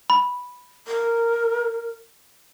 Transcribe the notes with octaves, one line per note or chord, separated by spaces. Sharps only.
B5
A#4